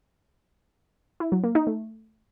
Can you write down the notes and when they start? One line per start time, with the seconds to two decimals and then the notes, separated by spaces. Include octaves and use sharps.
1.20 E4
1.32 F#3
1.44 A#3
1.55 D#4
1.67 A3